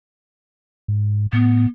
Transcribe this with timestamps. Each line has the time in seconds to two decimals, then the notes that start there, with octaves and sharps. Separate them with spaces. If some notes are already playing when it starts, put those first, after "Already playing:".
0.88 G#2
1.33 A2 B3